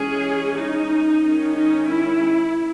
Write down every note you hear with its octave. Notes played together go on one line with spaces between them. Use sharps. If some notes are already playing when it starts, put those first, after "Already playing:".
Already playing: E3 G#3 C#4 G#4
D#4
D#3 G#3 C#4
D#4
E4